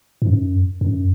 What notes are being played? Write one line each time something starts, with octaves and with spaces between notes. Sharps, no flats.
G#2
F#2
F#2